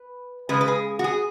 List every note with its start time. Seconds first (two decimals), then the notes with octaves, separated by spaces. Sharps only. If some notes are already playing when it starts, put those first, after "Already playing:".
Already playing: B4
0.49 C#3 G#3 B4
0.61 B4
0.68 G#4
0.99 F#4
1.04 G#4